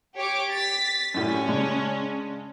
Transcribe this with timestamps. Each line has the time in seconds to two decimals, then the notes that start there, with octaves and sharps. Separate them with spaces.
0.15 G4 C#5 D6
0.52 A6 B6
1.14 F#2 A2 G3 C#4
1.48 C#3 G#3 D4